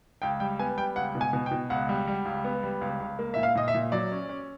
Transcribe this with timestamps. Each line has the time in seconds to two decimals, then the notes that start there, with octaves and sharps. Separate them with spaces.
0.22 C#2 G5
0.40 G3 G5
0.59 B3 G#5
0.78 G3 G5
0.96 C#2 F#5
1.15 B2
1.21 G#5
1.33 B2
1.46 G5
1.51 B2
1.70 C#2 F#5
1.89 G3
2.08 G3
2.26 C#2
2.44 B3
2.63 G3
2.81 C#2
3.00 C#2
3.19 A#3
3.34 A#2 E5
3.43 F5
3.55 A#2 D#5
3.68 E5
3.75 A#2
3.92 F#3 D5
4.12 C#4
4.29 C#4